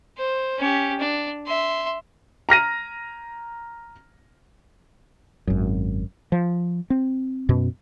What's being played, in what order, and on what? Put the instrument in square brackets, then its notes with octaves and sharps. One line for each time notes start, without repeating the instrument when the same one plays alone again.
[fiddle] C5
C#4 G4
D4
E5 C6
[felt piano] A#5 F6 A#6 D#7
[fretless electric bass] G#1 F#2
F3
C4
F#2 B2